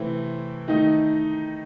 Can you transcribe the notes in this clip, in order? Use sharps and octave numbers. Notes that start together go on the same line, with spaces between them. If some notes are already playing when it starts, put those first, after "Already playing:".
Already playing: C3 E3 A3 C4 E4
D#3 A3 D#4